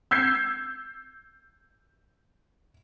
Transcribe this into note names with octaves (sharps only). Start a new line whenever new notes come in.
E6 G6 G#6 C7